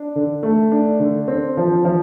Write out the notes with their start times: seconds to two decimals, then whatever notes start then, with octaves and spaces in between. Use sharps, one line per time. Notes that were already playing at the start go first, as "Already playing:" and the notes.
Already playing: D4
0.15 D3
0.43 A3
0.72 D4
0.99 D3
1.28 C4
1.57 F3
1.85 F3